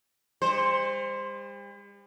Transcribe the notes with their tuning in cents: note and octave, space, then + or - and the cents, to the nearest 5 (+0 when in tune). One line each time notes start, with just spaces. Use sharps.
G3 +45 C5 +0